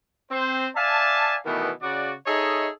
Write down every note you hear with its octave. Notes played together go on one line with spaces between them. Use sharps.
C4 C5
D5 E5 F5 G#5 A5
B2 D#3 E3 G3 A3 B3
C#3 F#4 D5
D#4 G#4 A4 C#5 D#5 E5